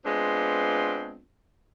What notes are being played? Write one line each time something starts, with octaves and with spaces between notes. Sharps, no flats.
G#3 B3 C4 D4 F4